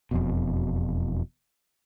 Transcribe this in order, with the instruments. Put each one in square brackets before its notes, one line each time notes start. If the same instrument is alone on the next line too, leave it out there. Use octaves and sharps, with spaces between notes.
[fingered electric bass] E1 F2 B2